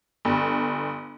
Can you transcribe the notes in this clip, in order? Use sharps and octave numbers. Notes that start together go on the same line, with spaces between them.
G1